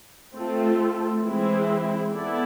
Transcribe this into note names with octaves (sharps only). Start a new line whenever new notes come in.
A3 C4 F4 A4
E3 G#3 C4 E4 G#4
B3 E4 A4 D5